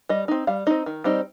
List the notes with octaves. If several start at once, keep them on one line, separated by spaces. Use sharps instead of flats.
G3 D#5
C4 D#4
G3 F5
C4 D#4 D#5
D#3
G3 C4 D#4